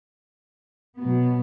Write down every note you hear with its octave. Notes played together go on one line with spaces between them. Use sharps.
B2 F#3 B3